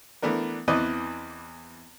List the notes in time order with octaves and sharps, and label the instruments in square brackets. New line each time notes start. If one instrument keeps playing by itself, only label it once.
[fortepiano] E3 A3 B3 D4 A#4
E2 E3 C4 B4 D5 D#5